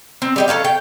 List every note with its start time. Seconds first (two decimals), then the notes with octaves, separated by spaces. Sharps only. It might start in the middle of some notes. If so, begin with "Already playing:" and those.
0.22 C4
0.36 G3 G4 D#5
0.48 A4 B4 C#5 F5
0.65 G5